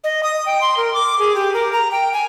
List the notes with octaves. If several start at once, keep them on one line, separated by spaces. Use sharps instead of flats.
D#5
D#6
G5
C6
A#4
D6
G#4
G4
A#4
A#5
G5
G#5